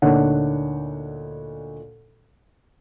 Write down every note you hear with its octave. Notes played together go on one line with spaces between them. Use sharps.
D2 A#2 D4 D#4 C#5 F#5